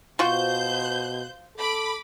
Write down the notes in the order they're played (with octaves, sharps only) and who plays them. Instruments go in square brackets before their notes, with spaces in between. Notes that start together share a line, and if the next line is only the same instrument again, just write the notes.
[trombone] B2 [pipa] F4 F#4 [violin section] C5 G6
[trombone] A4 [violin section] B5 D6